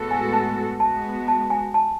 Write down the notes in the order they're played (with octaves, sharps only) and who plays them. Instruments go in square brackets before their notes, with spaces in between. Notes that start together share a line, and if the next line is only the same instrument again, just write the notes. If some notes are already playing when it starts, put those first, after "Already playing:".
Already playing: [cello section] A2 G#3 B3 F#4 A4
[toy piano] G#5
A5
[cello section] G#3 B3 F#4 [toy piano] A5
[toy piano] A5
G#5
A5